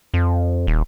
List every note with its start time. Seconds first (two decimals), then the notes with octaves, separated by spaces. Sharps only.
0.14 F2
0.67 D#1